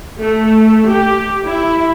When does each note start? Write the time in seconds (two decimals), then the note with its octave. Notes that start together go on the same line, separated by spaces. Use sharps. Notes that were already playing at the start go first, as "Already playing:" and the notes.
0.19 A3
0.88 G4
1.48 E4